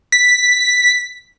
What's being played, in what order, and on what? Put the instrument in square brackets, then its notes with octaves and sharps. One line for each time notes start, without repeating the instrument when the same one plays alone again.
[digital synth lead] B6